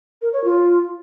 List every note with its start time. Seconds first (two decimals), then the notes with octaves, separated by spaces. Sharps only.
0.22 A#4
0.33 C#5
0.44 F4